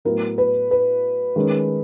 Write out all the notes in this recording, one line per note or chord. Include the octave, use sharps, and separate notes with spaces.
A2 F#3 B3 E4 A#4
B4
B4
D#3 G#3 C#4